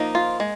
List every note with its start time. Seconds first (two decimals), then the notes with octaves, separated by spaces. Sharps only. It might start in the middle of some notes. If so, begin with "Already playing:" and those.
Already playing: F3 A#3 D#4
0.15 F4
0.40 G#3